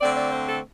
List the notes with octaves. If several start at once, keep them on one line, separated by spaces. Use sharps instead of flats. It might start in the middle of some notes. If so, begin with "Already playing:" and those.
D3 A3 C4 D5
D5
C5
A4